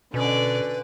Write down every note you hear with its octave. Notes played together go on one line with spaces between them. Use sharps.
B2 D3 C#4 B4 D5